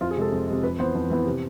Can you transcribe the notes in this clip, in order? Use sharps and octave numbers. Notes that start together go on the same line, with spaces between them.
F2 F4
G#4
C3 G#3 A4
F2
C3 G#3
F2 B4
E3 B3 C5
F2
E3 B3
C3